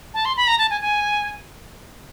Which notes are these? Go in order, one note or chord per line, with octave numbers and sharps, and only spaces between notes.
A5
C6
B5
A#5
A5
G#5
G#5